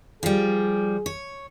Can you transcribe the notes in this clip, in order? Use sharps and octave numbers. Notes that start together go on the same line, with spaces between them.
F3 G3 G#4
C#5